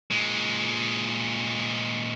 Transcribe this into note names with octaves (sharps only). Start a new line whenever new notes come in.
A#2 G#3